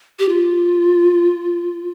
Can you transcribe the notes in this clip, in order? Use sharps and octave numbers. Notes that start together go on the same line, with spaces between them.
G4
F4